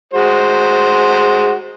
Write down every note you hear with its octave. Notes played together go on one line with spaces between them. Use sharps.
G#3 F#4 C5